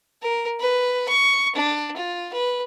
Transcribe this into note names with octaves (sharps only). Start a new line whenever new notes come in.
A#4
B4
C#6
D4
F4
B4